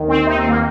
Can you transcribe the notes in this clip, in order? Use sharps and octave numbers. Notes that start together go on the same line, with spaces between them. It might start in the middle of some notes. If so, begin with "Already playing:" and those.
Already playing: D#2 D#3
C4
D#4
C4
A#3